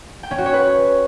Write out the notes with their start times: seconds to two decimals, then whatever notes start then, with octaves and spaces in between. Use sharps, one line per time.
0.23 G5
0.31 C#4
0.38 F#4
0.46 C#5
0.53 B4